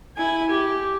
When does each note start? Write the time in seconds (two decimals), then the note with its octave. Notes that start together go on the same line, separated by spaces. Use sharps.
0.17 E4 G#5
0.50 G4